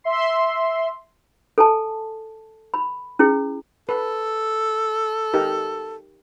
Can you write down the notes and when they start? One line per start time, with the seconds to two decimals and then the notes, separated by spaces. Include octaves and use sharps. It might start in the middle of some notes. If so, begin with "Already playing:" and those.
0.04 E5 C6
1.58 A4 G#5 A5
2.74 B5
3.19 C#4 E4 G#4
3.89 A4 B4
5.34 D#4 G4 A#4